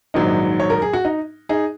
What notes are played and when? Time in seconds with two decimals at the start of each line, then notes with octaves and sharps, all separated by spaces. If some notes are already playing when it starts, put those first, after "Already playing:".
0.14 A#1 G#2 D#3 F#3 D#4
0.60 C#5
0.70 A#4
0.82 G#4
0.93 F#4
1.05 D#4
1.49 D#4 G#4